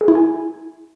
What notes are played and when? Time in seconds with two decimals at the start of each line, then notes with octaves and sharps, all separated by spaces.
0.01 G#4
0.08 E4
0.15 G#5